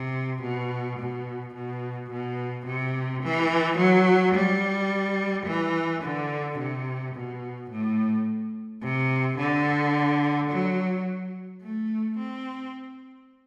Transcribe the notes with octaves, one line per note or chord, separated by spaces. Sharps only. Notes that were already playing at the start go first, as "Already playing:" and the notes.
Already playing: C3
B2
B2
B2
B2
C3
E3
F#3
G3
E3
D3
C3
B2
A2
C3
D3
F#3
A3
C4